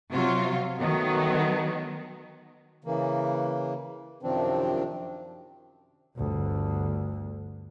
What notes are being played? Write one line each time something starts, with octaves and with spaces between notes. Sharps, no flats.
C3 F#3 F4
D#3 F#3 A3 B3
C#3 E3 A#3
F#2 C3 D#3 F3 C4 D4
G1 D2